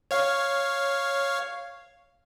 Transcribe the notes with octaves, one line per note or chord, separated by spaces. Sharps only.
C#5 F5